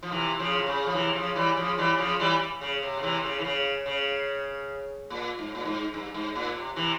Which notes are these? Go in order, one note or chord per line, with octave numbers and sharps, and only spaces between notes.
F3
C3 E3
C#3 F3
C3
C#3
F3
C3 E3
C#3 F3
E3 G3
C#3 F3
E3 G3
C#3 F3
E3 G3
C#3
C3
C#3
C3 E3
C#3
E3
C#3
C#3
A#2
G#2
A#2
G#2
G2
G#2
A#2
C3
C3 E3